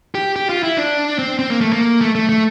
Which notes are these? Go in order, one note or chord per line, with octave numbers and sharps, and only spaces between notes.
G4
G4
F4
E4
D4
C4
C4
A#3
A3
A#3
A3
A3
A3